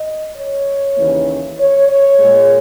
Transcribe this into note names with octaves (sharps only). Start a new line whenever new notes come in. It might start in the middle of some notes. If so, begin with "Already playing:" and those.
Already playing: D#5
C#5
D#2 C#3 E3 A#3
C#5
C#5
A#2 G#3